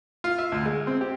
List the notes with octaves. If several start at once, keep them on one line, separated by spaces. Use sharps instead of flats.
F4
E5
D2
G#3
C4
G4